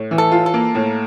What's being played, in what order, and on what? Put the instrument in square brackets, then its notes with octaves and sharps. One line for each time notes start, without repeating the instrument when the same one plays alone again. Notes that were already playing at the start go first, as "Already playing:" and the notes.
Already playing: [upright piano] A2
E3
[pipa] A4
[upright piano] F4
[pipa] A4
[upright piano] A#3
A2